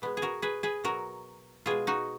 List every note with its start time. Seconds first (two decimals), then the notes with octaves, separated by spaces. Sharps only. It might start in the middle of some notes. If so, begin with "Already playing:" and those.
0.02 B2 G#3 B3
0.17 G#4
0.22 F#4 A#4
0.42 G#4 B4
0.63 G#4 B4
0.84 B2 F#3 F#4 A#4
1.66 B2 G#3 F4 G#4
1.87 D#4 F#4